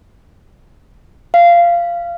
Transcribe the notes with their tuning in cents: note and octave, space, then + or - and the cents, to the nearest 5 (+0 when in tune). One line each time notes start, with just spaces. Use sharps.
F5 -15